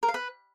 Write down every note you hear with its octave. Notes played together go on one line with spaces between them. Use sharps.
A#4
F5
B4